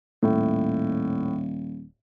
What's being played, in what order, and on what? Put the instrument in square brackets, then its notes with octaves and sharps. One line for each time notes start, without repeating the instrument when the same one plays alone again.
[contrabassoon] D#1 [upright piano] A2